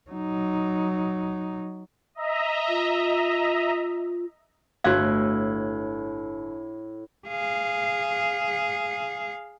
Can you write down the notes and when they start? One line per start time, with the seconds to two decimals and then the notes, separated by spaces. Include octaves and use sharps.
0.10 F#3 D#4
2.15 D#5 E5 A#5
2.69 F4
4.84 G1 A2 F#4 F5 F#6 G#6
7.28 G#4 F5